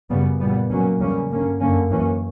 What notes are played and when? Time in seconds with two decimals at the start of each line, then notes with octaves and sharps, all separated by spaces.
0.10 F#2 C#3 G3 B3
0.40 A#2 G3 B3
0.70 B2 F#3 A#3 C#4
0.99 E2 C#3 G3 A#3 C#4
1.30 G2 D3 A#3 C#4
1.60 F#2 D3 A#3 C#4
1.89 F#2 E3 A#3 C#4